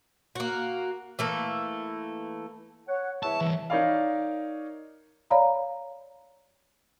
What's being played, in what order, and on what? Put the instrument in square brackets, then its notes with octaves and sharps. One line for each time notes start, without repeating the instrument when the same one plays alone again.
[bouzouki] A#3 F#4
E3 A3 A#3
[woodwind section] C#5 F#5
[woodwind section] E2 C#5 E5 [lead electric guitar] A5
[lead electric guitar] E3 G3
[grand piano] D#4 A#4 C#5 D5 F5
[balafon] C#5 D5 F5 A#5 B5